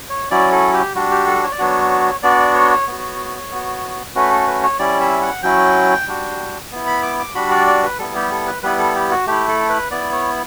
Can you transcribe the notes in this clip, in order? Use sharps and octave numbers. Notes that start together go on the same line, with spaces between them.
C#5
F#3 C#4 E4 D5
A4
G4
G3 D4 F#4
G4
A4
C#5
D5
F#3 B3 D4 F#4 C#5
B3 D4 F#4 D5
C#5
B3 F#4
B3 F#4
A3 C#4 F#4 B4
A4
B4
C#5
G3 C#4 E4 D5
E5
F#5
F#3 C#4 E4 G5
G3 D4 F#4
B3 E4
B5
D6
D6
G3 D4 F#4 B5
D5
D5
B4
G3 B3 E4 A4
G4
A4
B4
G3 B3 E4 B4
A4
G4
F#4
A3 E4 G4
A4
B4
B3 E4 D5
C#5